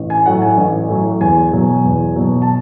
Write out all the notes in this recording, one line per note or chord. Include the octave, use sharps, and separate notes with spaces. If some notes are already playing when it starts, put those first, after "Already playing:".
Already playing: A1
G#5
A2 F#3 F#5
G#5
A1
A2 F#3
E2 G#5
B2 F#3
E2
B2 F#3
A5